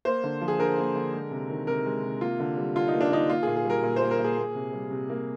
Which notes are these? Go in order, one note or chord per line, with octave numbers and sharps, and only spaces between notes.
A#3 C5
D3
F3
G#4
D3 A#4
A#3
D3
G#3
C3
D#3
C3 A#4
G#3
C3
A#3 F4
D3
G3
D3 F4
D#4
A#3
D4
D3 D#4
A#3 F4
A#2 G#4
G#4
G3 A#4
A#2
C5
A#3
A#4
A#2
G#4
A#3
C3
G3
C3
A#3